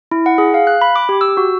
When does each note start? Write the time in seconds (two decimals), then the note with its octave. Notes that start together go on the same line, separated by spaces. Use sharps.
0.12 E4
0.26 F#5
0.38 G#4
0.54 F5
0.67 F#6
0.82 B5
0.96 D6
1.09 G4
1.21 E6
1.37 F#4